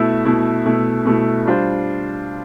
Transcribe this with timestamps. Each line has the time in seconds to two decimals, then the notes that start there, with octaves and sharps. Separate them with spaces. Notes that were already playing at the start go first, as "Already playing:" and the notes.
Already playing: B2 A3 E4
0.25 B2 A3 E4
0.66 B2 A3 E4
1.05 B2 A3 E4
1.46 G3 D4 F4 C5